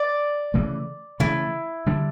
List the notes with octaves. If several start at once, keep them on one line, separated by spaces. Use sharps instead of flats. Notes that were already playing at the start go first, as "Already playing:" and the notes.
Already playing: D5
C#3 E3 A3
C#3 E3 A3 E4
D3 G3 D4